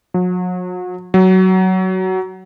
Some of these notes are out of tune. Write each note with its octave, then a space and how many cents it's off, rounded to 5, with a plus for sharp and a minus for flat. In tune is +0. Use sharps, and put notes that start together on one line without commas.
F#3 -40
F#3 +15